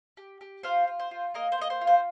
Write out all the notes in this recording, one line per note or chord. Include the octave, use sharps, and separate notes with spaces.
G4
G4
F4 C5 F5
F4
C5
F4
A#3 A#4 D#5
C5
A#3 D#5
C5
F4
C5